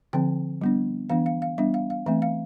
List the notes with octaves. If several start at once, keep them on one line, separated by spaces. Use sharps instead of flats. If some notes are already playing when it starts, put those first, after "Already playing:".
D3 F3 C4 G5
G3 B3 D4
E3 B3 D4 F5
F5
F5
G3 B3 D4 E5
F5
F5
E3 A3 C4 E5
F5